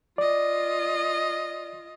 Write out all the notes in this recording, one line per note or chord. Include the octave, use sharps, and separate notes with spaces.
F4 D5 D#5